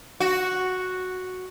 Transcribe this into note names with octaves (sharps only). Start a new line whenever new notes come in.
F#4